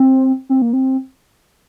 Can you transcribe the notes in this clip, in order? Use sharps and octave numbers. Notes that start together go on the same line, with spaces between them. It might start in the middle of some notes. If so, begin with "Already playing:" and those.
Already playing: C4
C4
A#3
C4